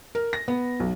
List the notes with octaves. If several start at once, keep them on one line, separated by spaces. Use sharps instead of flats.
A#4
A#6
B3
B1